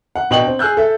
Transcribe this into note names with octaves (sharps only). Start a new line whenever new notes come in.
F#5
B2 D4 D#5 G5 C#6 F#7
C4
G#4 G#5 E6 F#6 G6
A4 E5